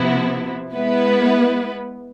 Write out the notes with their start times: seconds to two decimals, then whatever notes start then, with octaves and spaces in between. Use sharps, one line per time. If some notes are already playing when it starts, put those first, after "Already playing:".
Already playing: C3 F3 B3 E4
0.74 G#3 B3 E4 B4